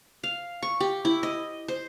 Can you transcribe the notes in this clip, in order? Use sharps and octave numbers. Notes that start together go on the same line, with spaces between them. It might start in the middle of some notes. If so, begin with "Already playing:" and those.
F5
C#6
G4
E4
D#5
C5